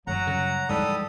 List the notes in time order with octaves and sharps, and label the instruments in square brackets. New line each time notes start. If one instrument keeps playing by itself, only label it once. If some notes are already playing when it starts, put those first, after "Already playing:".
[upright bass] F#2 G3 [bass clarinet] F#3 [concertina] F#5 A#5
[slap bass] C#3
[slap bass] G#2 F3 G#3 [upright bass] E3 [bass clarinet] G3 [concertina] A4 D#6